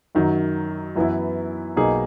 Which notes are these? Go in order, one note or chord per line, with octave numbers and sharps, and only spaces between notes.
F#2 D#3 F#3
F#2 E3 B3 E4
B1 B2 A#3 D#4 G#4